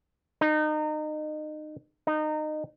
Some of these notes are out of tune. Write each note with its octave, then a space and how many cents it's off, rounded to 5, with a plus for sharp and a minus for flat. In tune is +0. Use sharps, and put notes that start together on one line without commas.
D#4 -30
D#4 -25